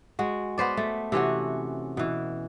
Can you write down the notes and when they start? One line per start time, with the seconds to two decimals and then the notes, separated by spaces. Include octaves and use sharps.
0.19 G#3 F#4
0.58 B3 B4 C5 D5
0.77 A3
1.12 C3 E3 C#4 F#4
1.97 B2 E3